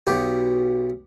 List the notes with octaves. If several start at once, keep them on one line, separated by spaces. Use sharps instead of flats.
B1 B2 G4